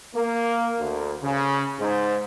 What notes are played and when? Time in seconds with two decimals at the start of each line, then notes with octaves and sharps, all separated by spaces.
0.16 A#3
0.80 D2
1.23 C#3
1.79 G#2